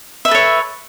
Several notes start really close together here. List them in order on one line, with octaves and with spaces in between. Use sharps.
E5 B4 A4 C#5